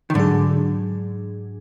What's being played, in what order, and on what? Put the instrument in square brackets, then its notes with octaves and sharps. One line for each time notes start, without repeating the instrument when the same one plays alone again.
[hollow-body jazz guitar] D#3
[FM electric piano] G#2 F#3 D4 G#4 [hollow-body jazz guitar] D3